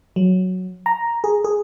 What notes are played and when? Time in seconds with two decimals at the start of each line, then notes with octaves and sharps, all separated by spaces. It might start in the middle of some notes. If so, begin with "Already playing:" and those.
0.16 F#3
0.86 A#5
1.24 G#4
1.44 G#4